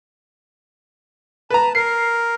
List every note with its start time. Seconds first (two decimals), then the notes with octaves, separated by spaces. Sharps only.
1.50 B4 A5 A#5
1.75 A#4 C7